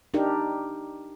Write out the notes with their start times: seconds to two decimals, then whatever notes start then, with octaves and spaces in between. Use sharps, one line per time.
0.14 D4 D#4 G4 A#4